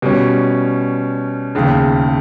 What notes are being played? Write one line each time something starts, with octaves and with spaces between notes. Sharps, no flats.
B2 G3 C#4
E1 D#2 C#3